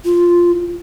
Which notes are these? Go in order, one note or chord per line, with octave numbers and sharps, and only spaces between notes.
F4